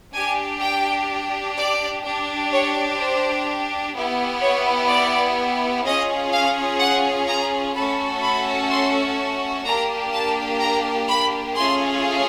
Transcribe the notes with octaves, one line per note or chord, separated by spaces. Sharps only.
D4 G4 G#5
G5
D5
D4 G4
C#5
C5
B3 E4 G4
C#5
D5
C#4 F4 G#4 D#5
F5
F#5
A#5
A3 C#4 F#4 A4 B5
B5
C6
A#3 D4 G4 A#5
A5
A#5
B5
A3 C#4 F4 G#4 C6